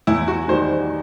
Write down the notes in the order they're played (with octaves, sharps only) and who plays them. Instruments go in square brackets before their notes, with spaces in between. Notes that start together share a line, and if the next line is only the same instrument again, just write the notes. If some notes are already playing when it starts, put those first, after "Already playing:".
[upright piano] E2 [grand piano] E4
[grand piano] F#4
[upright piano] D#3 G3 D#4 F#4 [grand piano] C5